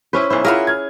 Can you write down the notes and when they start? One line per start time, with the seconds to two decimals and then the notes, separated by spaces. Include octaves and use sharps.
0.13 C#4 E4 B4 C5
0.30 B1 E4 C5
0.45 E4 F4 G#4 A#4 E5 F#5
0.67 F6 G#6